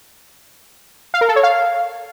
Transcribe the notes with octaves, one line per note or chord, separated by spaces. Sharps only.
F5
A#4
A4
C#5
F5